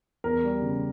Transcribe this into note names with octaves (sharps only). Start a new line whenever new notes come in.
E2 A#4
G3
C#3